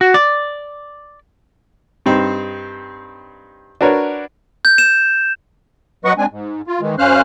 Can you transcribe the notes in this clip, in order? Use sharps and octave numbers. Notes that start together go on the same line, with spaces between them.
F#4
D5
G2 C4 D#4
D4 F#4 A#4 B4 C#5
G6
E7
F#3 B4 D#5 F#5 C#6
G#3 C4 D4 G#5
G#2
F4
D#3 E3 G#3
F#2 C#4 C5 F5 F6 F#6